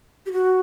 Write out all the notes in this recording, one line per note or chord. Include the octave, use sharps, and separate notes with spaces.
G4
F#4